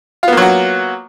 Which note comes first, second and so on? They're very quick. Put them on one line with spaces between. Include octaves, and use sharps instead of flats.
F4 B3 A#3 F#3 F#4